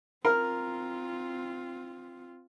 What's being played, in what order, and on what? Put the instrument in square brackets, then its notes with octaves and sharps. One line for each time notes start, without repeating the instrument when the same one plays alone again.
[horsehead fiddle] C4 F4 [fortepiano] A#4